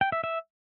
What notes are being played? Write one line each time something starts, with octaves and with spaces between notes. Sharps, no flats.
G5
E5
E5